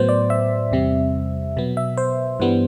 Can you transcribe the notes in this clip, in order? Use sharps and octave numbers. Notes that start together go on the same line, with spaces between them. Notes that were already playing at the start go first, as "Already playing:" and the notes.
Already playing: A2 F#3 B3 C5
D5
E5
E2 C3 G3 C4
B2 F#3 B3
E5
C5
G2 E3 G3 B3